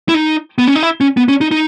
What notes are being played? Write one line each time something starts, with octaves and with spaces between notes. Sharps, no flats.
E4
D#4
B3
C#4
D#4
E4
C#4
B3
C#4
D#4
D#4